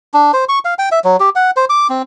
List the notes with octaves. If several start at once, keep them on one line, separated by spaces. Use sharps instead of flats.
D4
C5
C#6
F5
G5
E5
F#3
G4
F#5
C5
D6
C4